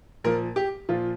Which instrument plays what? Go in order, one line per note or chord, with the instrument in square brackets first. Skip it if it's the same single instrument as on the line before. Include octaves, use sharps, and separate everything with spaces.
[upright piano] A#2 F3 A#4
G4
A#2 F3 F4